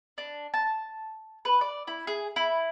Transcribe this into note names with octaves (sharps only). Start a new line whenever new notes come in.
D4
A5
B4
D5
E4
G#4
E4